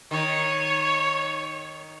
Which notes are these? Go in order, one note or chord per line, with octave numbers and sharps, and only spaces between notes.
D#3 C#5